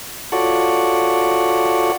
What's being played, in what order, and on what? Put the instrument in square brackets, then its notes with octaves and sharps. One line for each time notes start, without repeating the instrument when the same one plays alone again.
[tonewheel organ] F4 F#4 A4 C#5 D5 F#5